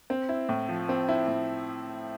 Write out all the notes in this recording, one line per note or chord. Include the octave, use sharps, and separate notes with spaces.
C4
E4
A2
F3
C4
E4
A2